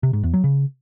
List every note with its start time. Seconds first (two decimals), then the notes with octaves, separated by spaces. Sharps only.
0.03 C3
0.13 G#2
0.23 E2
0.34 F#3
0.44 C#3